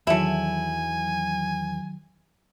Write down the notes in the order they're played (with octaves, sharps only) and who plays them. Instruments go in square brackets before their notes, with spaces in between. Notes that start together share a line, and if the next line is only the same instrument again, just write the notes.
[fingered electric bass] E2 [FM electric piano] D#3 F#3 [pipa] A3 E4 [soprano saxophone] G#5